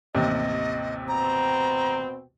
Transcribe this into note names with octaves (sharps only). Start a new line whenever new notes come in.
A1 D#2 C3 D#5
B2 C4 A#5